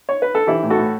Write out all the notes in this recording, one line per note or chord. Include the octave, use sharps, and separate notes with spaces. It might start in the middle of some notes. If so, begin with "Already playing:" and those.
C#5
B4
A4
E3 E4 G4
A2
F#4 A4
A2